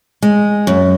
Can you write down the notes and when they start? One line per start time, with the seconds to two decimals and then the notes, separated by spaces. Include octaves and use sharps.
0.22 G#3
0.67 F#2